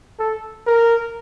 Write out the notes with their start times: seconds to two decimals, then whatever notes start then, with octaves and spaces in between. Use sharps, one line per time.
0.19 A4
0.67 A#4